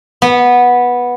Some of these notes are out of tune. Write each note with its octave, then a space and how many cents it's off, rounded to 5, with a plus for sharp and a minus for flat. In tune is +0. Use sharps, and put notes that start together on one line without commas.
B3 -10